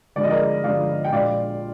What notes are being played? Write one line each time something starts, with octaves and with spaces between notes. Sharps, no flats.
G1 G2 F3 G#3 D5
D#5
A#4 D5
G1 G2 F3 G#3 D5 F5
G5
A#1 A#2 G#3 D5 F5